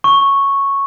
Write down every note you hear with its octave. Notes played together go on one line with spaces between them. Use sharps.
C#6